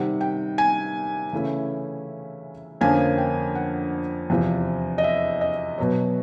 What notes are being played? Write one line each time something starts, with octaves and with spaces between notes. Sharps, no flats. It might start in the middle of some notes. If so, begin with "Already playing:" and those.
Already playing: C3 D#3 G3 F#5
G5
G#5
C#3 E3 A3 C#4 E4
F2 D3 F3 A#3 C#4 G#5
G5
F#5
E2 C3 F3
D#5
E5
D#5
B2 F#3 B3 C#5